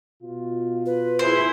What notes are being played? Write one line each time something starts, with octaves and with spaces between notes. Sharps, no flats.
B2 F4
B4
E4 G#4 C5